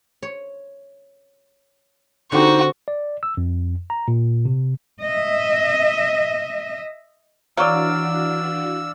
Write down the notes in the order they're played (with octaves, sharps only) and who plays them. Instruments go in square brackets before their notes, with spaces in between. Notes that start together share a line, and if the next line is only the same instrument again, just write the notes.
[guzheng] C#5
[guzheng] D3 C4 G4 [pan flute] D#4 [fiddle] F#4 C#6
[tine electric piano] D5
E6
F2
A#5
A#2
C3
[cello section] D#5 E5
[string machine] E3 D4 F#4 [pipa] F#3 [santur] D5 F5 [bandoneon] E6